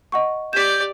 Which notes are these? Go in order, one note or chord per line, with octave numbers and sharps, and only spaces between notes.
D#5 F#5 C#6
G4 D5 G6 B6 E7